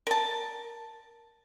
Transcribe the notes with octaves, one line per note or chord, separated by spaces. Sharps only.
A#4 A5